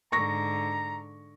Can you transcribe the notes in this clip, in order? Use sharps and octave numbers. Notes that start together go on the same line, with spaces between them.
G#2 D3 A#5 C#6 A#6